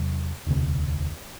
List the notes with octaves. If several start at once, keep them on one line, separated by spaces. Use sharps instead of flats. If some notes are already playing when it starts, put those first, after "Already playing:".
Already playing: E2 C3 F#3
E1 D2 C3